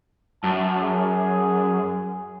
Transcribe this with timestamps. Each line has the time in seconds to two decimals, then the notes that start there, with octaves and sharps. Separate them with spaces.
0.44 F#2 A5
0.83 G#4